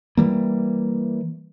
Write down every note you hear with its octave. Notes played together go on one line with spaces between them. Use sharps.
E3 G3 A#3